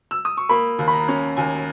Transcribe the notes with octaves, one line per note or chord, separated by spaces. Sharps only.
E6
D#6
C#6
A#3 B5
D#2
B5
A#5
C#4
D#2 G#5